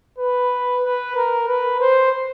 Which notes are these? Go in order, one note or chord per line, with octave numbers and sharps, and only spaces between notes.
B4
B4
A#4
B4
C5